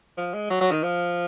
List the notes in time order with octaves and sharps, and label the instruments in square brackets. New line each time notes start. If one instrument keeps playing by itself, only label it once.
[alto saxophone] F3
G#3
F#3
F#3
D#3
F3